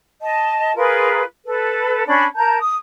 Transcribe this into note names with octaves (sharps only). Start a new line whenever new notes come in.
D#5 A5
F4 G#4 A#4 B4
A4 B4
C#4 D4 D5 B5
A#4 A5 A#5 G6
D#6